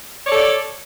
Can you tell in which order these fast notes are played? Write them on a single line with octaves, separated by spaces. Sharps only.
C#5 D5 A4